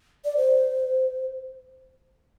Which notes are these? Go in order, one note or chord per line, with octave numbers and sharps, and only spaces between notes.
D5
C5